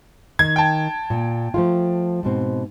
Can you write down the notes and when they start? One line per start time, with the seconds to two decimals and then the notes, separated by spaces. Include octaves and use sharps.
0.39 D#3 G#6
0.56 G5 A5
1.10 A#2
1.54 F3 A3 F4
2.23 G#2 B2 C4